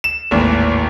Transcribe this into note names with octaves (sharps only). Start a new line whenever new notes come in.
E7
G#1 D#2 A2 E3